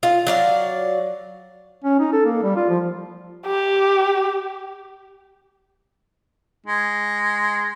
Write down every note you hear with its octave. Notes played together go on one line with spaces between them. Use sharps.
F4
F#3 D5 F5
C#4
D#4
A4
A#3
G3
F4
F3
G4
G#3